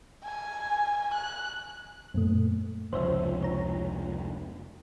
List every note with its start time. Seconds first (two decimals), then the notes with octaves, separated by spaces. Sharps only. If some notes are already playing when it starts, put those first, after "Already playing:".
0.24 G#5
1.14 F#6
2.14 F#2 A#2 A3
2.93 F1 C#2 C5 C#5 E5
3.43 C#5 A#5